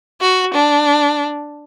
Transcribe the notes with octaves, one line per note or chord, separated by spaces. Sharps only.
F#4
D4